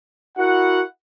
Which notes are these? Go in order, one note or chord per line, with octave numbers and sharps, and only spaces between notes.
E4 F#4 A#4 F#5